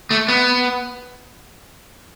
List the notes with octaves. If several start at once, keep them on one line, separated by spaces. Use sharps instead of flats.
A3
B3